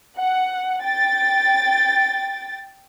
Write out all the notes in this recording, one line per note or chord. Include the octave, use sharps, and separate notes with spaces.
F#5
G5 A6